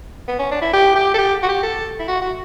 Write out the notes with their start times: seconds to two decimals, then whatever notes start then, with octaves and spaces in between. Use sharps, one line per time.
0.28 B3
0.39 C#4
0.51 D4
0.62 E4
0.73 G4
0.96 G4
1.14 A4
1.18 G4
1.43 F#4
1.49 G4
1.63 A4
2.00 E4
2.08 F#4
2.21 F#4